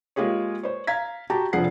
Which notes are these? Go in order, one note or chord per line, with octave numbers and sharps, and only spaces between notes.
G#3 A#3 F4 G4 G#4 C#5
C5 C#5
F5 A#5 G#6 B6
F#4 G4 G5 A5 A#5
F1 F3 D4 G#4 F#5 C7